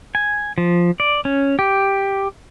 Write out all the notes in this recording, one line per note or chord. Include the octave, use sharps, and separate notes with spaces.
G#5
F3
D5
C#4
G4